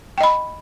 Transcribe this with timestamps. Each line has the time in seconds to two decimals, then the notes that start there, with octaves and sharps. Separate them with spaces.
0.18 G5
0.21 D#5
0.23 B5